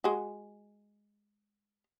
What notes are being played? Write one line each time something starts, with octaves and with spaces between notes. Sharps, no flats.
G#3 F#4